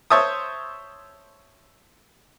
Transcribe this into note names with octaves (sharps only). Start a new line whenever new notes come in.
C5 C#5 E5 A5 D#6